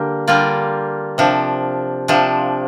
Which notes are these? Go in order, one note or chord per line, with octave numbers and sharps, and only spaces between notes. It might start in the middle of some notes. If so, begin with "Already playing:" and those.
Already playing: D3 G3 A#3
D3 G3 A#3 F4 D5
C3 F3 D4
C3 F3 D4